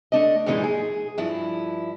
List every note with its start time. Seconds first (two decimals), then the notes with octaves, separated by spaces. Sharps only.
0.12 A3 D4 D#5
0.46 F#2 A#2 E3 G#3 D#4
0.64 G#4
1.18 G2 F3 E4